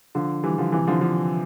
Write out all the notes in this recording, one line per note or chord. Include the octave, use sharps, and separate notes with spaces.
D3 F3
E3 G3
D3 F3
C3 E3
D3 F3
D3 F3